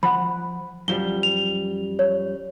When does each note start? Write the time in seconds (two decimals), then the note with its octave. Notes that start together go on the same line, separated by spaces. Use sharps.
0.03 F3 F#5 B5
0.88 F#2 F3 G3 G7
1.23 F7
1.99 C#5